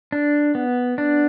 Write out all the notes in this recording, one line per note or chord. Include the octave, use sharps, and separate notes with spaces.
D4
B3
D4